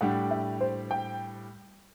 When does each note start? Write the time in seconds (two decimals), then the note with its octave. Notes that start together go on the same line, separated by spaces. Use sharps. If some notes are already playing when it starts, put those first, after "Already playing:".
0.01 A2 G3 D4 G4 F#5
0.31 E5
0.61 C5
0.91 G5